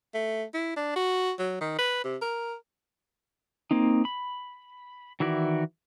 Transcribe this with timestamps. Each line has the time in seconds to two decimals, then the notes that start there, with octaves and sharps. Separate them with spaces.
0.14 A3
0.54 E4
0.76 D4
0.96 F#4
1.39 F#3
1.61 D#3
1.78 B4
2.04 C3
2.22 A#4
3.71 A#3 C4 D#4
4.05 B5
5.20 D#3 E3 E4 F#4 D5